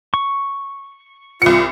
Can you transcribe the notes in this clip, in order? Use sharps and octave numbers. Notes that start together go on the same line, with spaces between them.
C#6
C2 F4 C#7